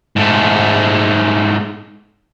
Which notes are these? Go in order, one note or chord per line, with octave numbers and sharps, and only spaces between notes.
G#2 A3